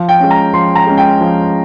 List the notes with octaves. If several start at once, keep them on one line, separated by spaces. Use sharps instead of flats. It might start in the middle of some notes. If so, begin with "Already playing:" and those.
Already playing: F3
G5
G#3 C#4
A#5
F3 C6
A#5
G#3 C#4
G5
F3